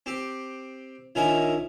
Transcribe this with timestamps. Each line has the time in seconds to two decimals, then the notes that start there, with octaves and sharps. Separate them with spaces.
0.06 C4 G4
1.15 A#1 D#3 C#4 E4 G#5 A#5